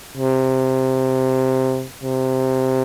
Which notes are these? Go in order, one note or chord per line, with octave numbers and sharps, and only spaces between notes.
C3
C3